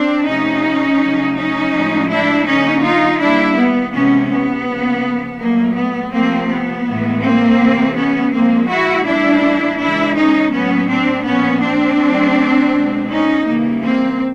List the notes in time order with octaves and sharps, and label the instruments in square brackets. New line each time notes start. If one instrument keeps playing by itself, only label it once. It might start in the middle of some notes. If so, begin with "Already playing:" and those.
Already playing: [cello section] C4 D4
C3 F3 A3 C#4 D#4
C#3 F#3 A3
C#4 D#4
A2 F3 G#3
D4 E4
D3 F#3 A#3 C#4 D#4
D#4 F4
D#3 G3 A#3 D4 E4
B3
C3 E3 G#3 B3 C#4
B3
C#3 F3 A#3
A#2 F#3 A3 A#3
B3
C3 F3 A3 A#3 C4
B3
A2 E3 G#3
A#3 C4
C3 E3 A3
B3 C#4
A#2 F3 G#3 A#3 C4
E4 F#4
A2 E3 G3 A#3 D4 E4
C#3 E3 G#3 D4 E4
C#4 D#4
A2 F#3 A#3 B3 C#4
C4 D4
A#2 F3 A#3 B3 C#4
C4 D4
C#3 F#3 A3
B2 G#3
C#4 D#4
C#3 E3 G3 A#3
A#3 C4